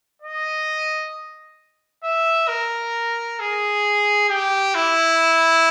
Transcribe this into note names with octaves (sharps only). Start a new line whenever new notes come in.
D#5
E5
A#4
G#4
G4
E4